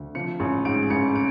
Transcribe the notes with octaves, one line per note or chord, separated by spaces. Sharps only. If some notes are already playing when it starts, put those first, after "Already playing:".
Already playing: D2
F3 C#7
A1
G#2 D7
A1 C#7
D7